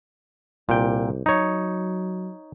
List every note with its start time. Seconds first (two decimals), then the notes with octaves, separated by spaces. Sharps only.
0.69 C2 A#2 G5
1.26 F#3 D#4 C#5